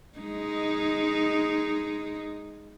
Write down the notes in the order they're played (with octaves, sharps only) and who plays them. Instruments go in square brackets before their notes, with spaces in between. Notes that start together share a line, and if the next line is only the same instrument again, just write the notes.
[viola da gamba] G#3 D#4